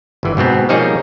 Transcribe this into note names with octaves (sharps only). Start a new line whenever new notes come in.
G1 E3
G#2 B2 B3 C4
F3 G3 A#3 D#4 G#4 C#5